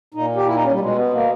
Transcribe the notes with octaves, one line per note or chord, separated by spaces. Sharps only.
A#2 D#4
G4
E4
D#4
C#4
G3
B2 G#3
B3
A#3